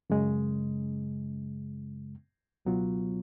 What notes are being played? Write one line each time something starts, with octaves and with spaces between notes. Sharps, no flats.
F#2 C#3 G#3
C#2 B2 F#3 B3 F4